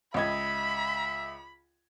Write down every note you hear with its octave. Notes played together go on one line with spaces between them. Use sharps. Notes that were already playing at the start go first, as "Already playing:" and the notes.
C#2 D#5 E5 B5 G#6